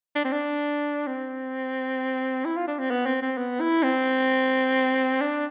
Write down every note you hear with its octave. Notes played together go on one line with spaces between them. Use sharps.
D4
C4
D4
C4
E4
F4
D4
C4
B3
C4
C4
B3
E4
C4
D4